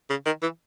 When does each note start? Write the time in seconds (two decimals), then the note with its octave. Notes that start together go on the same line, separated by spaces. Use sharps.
0.10 C#3
0.25 D#3
0.42 E3